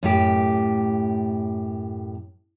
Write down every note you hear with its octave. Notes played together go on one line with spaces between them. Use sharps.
F#2 A2 G4